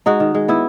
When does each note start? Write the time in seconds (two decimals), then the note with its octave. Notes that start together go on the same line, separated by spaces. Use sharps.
0.06 G#3 D#4 F#4
0.20 D#3
0.34 G#3
0.48 B3 E4